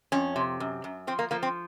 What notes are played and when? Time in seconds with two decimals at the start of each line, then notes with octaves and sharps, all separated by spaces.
0.12 F2 C#4
0.36 C3
0.60 F#2
0.84 F#2
1.07 F3 C4
1.19 A#3
1.31 F3 A#3
1.43 C4